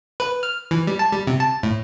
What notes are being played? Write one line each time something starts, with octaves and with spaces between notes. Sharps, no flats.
B4
F6
E3
G3
A5
G3
C3
A5
A2